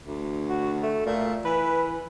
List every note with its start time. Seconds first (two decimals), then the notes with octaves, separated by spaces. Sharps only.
0.06 D2
0.49 F#4
0.83 A3
1.06 A#2 A3
1.45 E3 B4